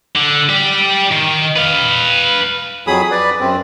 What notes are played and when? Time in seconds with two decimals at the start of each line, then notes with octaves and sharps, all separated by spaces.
0.16 D3
0.49 G4 D5
1.12 D#3
1.56 B4 F5
2.87 F2 F#3 G#4 B5 D#6
3.11 B4 D5
3.40 F#2 C4